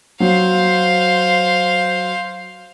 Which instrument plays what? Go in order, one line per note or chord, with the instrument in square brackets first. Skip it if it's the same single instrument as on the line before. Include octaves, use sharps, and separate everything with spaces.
[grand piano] F#3 [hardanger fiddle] C5 F5